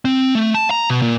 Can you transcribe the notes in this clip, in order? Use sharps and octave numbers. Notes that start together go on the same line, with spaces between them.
C4
A3
A5
A#5
B2
A#2